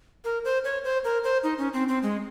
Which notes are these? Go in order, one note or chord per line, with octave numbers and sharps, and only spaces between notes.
A#4
C5
C#5
C5
A#4
C5
D#4
C#4
C4
C4
G#3